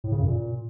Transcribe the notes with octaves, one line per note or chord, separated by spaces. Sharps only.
A2
C#3
F#2
A#2